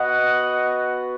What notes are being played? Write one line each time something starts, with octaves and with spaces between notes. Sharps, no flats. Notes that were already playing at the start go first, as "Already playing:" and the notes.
Already playing: B3 F#4 D#5 F#5